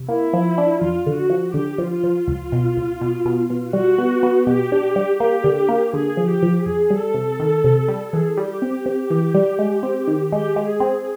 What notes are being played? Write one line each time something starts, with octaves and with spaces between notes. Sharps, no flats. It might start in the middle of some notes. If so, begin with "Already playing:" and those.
Already playing: C3
A#3 E4
F3
D4
F2 F4
D3
F#4
F3
D3 G4
F3
F4
F3
C#2
B2
C#2
B2
B2
B2
G3 F#4
B3
B3
B2 G4
D4
G3
A#3 G4
D3
A#3
D3 G#4
F3
G4
F3
F2 G#4
G3
A4
C3
D#3
C3
G3
E3 G#4
G3
G4
C4
C4
E3
G3
G#3
C4
D#3
G#3 G4
G#3
G#4
C4